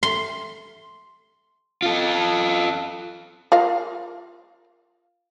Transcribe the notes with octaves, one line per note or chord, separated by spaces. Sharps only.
C6
F4 A4
F4 A#4 F5